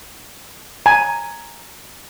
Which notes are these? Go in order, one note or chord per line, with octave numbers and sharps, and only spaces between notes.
G#5 A#5